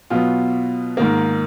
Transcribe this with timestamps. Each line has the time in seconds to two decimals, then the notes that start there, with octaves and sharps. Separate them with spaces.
0.10 B2 F#3 B3 F4
0.97 G#2 D#3 A#3